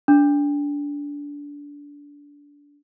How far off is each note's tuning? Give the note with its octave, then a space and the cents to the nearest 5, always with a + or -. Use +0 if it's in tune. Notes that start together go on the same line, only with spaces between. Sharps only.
D4 -25